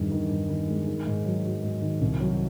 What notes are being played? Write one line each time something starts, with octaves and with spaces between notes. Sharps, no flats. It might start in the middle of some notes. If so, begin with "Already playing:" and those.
Already playing: E2 G2 D#3
D#3
G2
D#3
G#3
D#3
G#2
F#3
F#3
G#2
D#3
C2
F#3